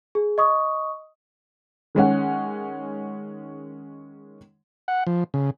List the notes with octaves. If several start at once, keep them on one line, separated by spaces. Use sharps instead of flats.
G#4
D#5 C#6 D#6
D#3 G#3 C#4 F#5
F#5
F3
C#3